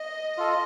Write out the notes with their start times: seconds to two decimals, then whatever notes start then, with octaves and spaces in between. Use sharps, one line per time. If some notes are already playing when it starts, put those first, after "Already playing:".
Already playing: D#5
0.37 F4 A4